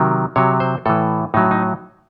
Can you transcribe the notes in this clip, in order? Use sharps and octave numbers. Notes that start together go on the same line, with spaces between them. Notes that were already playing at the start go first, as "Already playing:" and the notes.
Already playing: C3 D#3 F#3
C3 F#3 C#5
C5
A2 E3 A4
A2 F#3 D#4
D#4